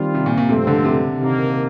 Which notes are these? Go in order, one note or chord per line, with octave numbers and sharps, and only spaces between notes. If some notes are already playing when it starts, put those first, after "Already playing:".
Already playing: D#3 G3 C4 F4
C3
A#2
A#2
G2 C3 F3 A3 C4
D3
C3
C3 D#3 A#3